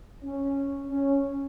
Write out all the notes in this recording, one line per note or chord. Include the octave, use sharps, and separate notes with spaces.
C#4
C#4